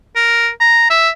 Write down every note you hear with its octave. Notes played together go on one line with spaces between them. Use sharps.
A#4
A#5
E5